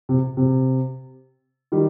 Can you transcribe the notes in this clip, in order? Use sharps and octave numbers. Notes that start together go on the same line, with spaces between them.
C3
C3
D#3 G3